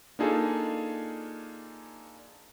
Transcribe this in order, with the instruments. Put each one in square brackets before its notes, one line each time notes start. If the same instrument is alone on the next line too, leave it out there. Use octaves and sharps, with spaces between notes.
[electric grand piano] A#3 D4 D#4 F4 G#4 A4